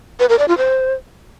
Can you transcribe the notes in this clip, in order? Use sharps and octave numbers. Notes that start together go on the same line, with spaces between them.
B4
A#4
D5
F4
C5